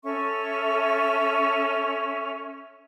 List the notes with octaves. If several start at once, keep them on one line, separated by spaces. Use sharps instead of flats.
C#4 A4 E5 C#6